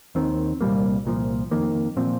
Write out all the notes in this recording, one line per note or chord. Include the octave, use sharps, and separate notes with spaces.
D#2 D#3 C4
C2 A#2 G3 A#3
C2 A#2 F3
F2 D#3 A#3
A#2 F3 C4